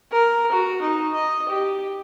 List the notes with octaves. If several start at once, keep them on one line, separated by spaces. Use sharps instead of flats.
A#4
F#4
D#4
D#5
G4